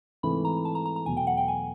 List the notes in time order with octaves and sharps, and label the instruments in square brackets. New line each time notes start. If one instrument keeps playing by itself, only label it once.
[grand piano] G#2 E3 A3 C4 [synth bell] B5
[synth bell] A#5
A5
A#5
A#5
A#5
[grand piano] E2 B2 F#3 A3 [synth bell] G#5
[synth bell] G5
F#5
G5
G#5